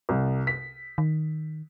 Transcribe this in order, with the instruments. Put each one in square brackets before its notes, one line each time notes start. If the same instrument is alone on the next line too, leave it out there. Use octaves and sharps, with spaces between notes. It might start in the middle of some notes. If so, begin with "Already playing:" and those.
[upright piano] C2
B6
[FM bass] D#3